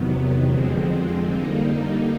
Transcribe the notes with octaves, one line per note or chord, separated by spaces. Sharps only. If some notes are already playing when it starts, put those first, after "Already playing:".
Already playing: E2 C3 D#3 F#3 B3
F2 D3 F3 G#3 C4
D3 G3 A#3 D#4